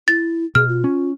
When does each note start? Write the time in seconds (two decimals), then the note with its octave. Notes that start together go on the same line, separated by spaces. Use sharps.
0.08 E4 A6
0.55 B2 G#4 F6
0.68 F4
0.84 C#4